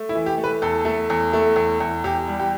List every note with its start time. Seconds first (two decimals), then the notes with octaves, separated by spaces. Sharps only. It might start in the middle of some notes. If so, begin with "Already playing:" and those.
Already playing: A3
0.09 E4
0.15 E3
0.26 G4
0.38 A3
0.44 B4
0.62 E2 A4
0.85 A3
1.10 E2
1.33 A3
1.56 E2
1.80 E2
2.04 E2 G4
2.28 G3
2.40 G4